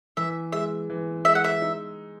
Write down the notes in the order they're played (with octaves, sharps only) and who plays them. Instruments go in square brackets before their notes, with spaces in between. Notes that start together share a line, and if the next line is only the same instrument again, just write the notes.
[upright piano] E3 [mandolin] E5
[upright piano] G#3 [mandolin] E5
[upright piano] E3
[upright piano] G#3 [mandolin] E5
[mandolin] F#5
E5
[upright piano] D#4